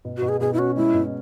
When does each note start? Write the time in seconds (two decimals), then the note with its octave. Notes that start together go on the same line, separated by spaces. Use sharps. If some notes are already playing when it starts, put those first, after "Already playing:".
0.05 B2
0.17 F#4
0.22 B2
0.29 G#4
0.40 B2 G#4
0.53 E4
0.59 C#4 F#4
0.76 G#3 E4
0.94 B2